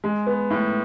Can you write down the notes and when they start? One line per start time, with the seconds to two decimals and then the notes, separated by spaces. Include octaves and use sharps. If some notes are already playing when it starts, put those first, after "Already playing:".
0.04 G#3
0.27 B3
0.50 A2